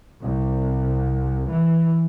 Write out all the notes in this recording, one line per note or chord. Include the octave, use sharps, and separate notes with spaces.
C2
E3